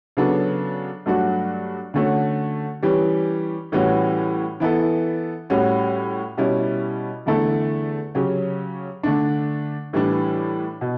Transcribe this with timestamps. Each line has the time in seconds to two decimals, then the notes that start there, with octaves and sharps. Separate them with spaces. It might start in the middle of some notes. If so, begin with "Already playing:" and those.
0.17 C#3 F#3 B3 D4 A4
1.06 G2 F#3 A3 D4 F#4
1.94 D3 A3 C#4 F#4 A4
2.83 E3 G3 C#4 G4
3.72 A2 E3 G3 C#4 F#4
4.60 E3 B3 E4 A4
5.50 A2 G3 C#4 F#4
6.37 B2 G3 C#4 E4
7.26 E2 D3 A3 E4 A4
8.15 C#3 F#3 C#4 G4
9.03 D3 A3 D4
9.93 A2 E3 G3 D4
10.81 B2